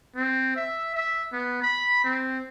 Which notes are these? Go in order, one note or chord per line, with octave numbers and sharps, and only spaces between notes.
C4
E5
E5
B3
B5
C4